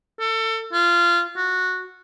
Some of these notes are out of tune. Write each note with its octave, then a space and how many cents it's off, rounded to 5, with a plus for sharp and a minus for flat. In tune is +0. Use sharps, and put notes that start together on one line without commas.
A4 +30
F4 -20
F#4 -10